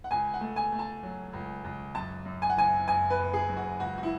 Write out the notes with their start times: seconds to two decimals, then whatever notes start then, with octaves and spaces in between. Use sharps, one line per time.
0.04 F#5
0.11 C#2 G#5
0.34 F#5
0.41 A3
0.56 G#5
0.72 A3
0.79 A5
1.03 F#3
1.33 C#2
1.64 C#2
1.95 F#2 A5
2.25 F#2
2.42 G#5
2.50 F#5
2.57 F#1 G#5
2.88 F#1 G#5
3.10 B4
3.19 F#1
3.34 G#4
3.49 F#2
3.57 F#4
3.80 C#2 F#4
3.98 F#4
4.03 E4